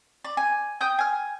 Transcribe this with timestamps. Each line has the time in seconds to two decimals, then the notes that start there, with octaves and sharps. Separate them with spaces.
0.24 D5
0.37 G#5
0.81 G5 D#6 G6
0.99 G#5 F6